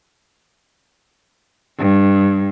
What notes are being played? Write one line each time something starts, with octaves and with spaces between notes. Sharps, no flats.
G2